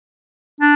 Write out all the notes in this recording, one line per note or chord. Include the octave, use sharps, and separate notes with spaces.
D4